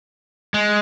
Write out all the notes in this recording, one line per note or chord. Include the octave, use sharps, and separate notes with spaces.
G#3